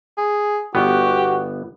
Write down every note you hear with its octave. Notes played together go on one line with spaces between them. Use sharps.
G#4
G1 B3 F#4 G4